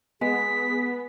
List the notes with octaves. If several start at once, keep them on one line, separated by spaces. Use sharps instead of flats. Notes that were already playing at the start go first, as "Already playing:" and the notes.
G#3 B3 G#4 B6